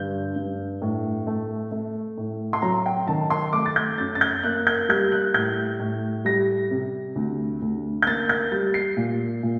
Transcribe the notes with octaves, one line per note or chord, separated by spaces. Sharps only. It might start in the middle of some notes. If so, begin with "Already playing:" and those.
Already playing: G2 D3 G6
G2
A2
A3
A3
A2
C6
F#3 A#5
G5
D#3 A5
C6
A3 D6
A6
G6
F#2 A6
A6
G6
A#3 F#6
G6
G3 G6
F#6
A2 G6
A2
G3 A#6
C3
D2
D2
G6
A#3 A6
G6
G3 A6
C7
A#2
A#2